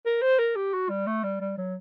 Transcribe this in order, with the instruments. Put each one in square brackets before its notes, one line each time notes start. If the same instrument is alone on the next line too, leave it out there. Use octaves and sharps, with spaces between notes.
[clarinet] A#4
C5
A#4
G4
F#4
G3
A3
G3
G3
F#3